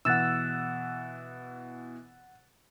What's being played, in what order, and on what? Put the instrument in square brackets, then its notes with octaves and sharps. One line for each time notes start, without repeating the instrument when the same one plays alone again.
[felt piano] B2 E3 [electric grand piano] F#5 E6 [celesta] F#6 A6 E7